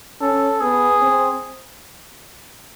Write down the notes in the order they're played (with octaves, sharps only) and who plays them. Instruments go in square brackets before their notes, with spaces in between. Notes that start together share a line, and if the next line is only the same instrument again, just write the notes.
[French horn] C#4 [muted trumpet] A4
[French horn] B3 [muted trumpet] G#4
[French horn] C4